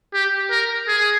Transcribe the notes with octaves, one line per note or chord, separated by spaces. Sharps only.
G4
A#4
G#4